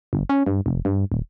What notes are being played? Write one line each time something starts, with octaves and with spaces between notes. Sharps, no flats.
G1
C#4
G2
F1
G2
D#1